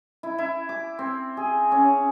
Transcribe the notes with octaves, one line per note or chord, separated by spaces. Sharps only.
E4
E4
D6
C4
G#4
C#4